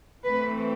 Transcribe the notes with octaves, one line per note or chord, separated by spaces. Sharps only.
E3 A3 C4 B4